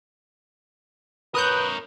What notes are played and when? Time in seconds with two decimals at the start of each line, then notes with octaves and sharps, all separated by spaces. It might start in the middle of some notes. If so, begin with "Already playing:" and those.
1.35 A#4 B4 C#5 D#6 F#6 G6